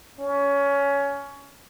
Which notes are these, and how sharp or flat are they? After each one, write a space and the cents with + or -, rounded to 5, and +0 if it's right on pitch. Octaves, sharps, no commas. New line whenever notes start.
C#4 +20